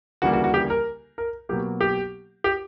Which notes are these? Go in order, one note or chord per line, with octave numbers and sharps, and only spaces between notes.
D2 C#3 E3 G3 A#3 F#4
F#4
F#4
G4
A#4
A#4
B2 F#3 A#3 G4
G4
G4